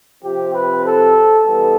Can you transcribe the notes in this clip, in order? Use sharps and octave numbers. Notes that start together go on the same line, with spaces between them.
C3 F3 C4 G4
B4
A4
E3 G3 B3 A4